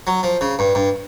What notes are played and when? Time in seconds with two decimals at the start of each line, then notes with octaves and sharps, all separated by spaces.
0.07 F#3
0.23 F3
0.41 C#3
0.59 G2
0.75 G2